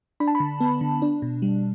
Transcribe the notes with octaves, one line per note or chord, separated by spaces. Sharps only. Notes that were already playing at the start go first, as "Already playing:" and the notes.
D4 B5
A5
B5
D3
B3
D3
D4
B2
G3